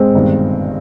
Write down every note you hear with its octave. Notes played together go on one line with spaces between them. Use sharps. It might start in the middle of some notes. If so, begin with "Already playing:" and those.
Already playing: G#3 C4
G1 G2 D#3